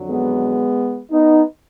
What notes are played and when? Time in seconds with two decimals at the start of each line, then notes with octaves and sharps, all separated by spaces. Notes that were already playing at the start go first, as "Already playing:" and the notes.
Already playing: F2 D3 F#3
0.09 G#3 B3
1.12 B3 D#4